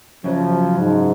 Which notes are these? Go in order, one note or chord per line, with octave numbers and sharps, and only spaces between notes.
F#2 C#3 F3 F#3
G#2